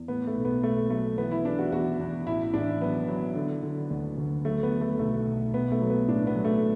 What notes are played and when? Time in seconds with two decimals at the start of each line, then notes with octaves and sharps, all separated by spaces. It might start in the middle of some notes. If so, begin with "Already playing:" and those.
Already playing: E2
0.08 A2 B3
0.27 A3
0.36 B1
0.45 B3
0.63 B1 A3
0.90 F#3 A3
1.18 E3 B3
1.31 E4
1.45 E3 D4
1.59 F#4
1.72 E2 F#4
2.00 E2
2.26 A1 E4
2.54 A1 D4
2.81 F#3 B3
3.08 F#3
3.36 D3
3.63 D3
3.90 D2
4.18 D2
4.45 F#3 A3
4.63 B3
4.72 F#3
4.81 A3
4.99 B1 A3
5.27 B1
5.54 B1 B3
5.72 A3
5.82 F#3
5.90 B3
6.08 A2 D4
6.27 B3
6.35 F#3
6.45 A3